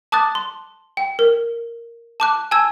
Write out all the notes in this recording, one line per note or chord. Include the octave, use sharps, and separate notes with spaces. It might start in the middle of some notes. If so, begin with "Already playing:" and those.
A5 D6 D#6 F#6 A6
C6
G5
A#4
A5 D6 F#6
G#5 A5 E6 G#6